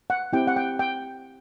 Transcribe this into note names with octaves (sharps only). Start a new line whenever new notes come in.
F#5
C4 E4 G4 G5
F#5
G5
G5